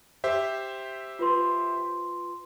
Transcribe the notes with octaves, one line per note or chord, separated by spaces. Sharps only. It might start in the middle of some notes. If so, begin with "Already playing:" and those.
G4 C5 E5
F4 B4 C6